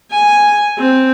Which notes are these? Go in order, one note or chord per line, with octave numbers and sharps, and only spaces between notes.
G#5
C4